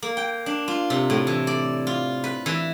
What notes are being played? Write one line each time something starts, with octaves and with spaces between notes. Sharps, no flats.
A#3
G5
D4
F4
C3
A2
E3
D5
F4
B4
E3